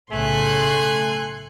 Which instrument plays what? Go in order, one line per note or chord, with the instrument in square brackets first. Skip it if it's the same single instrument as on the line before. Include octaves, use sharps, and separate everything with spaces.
[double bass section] B1 A2 C#3 [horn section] A3 [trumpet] G#5 [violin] C6 F#6